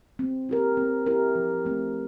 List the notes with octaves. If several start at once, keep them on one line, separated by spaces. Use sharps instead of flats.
C4
E4 G4 A#4
C4
E4 G4 A#4
F3
A3 C4